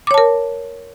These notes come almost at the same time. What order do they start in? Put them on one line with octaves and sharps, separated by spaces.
D6 C#5 A5 A#4